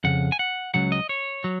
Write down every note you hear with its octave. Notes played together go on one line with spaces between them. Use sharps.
F2 C#3 F#5
G#5
F#5
C#2 C#3 F#3 F#5
D#5
C#5
F#3